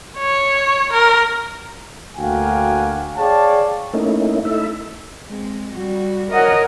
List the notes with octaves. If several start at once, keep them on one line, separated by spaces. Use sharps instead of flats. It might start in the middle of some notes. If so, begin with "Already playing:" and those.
C#5
A#4
D2 A#3 F#4 F5 G5 G#5
G#4 C#5 D5 F5 G5 A5
A3 A#3 C#4 D#4 E4
A3 D#4 E4 A4 E5
G#3 C4
G3 F#4
A#4 C#5 D#5 F#5